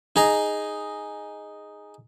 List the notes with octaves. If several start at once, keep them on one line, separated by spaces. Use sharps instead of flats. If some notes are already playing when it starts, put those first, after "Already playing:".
D#4 G#4 A#5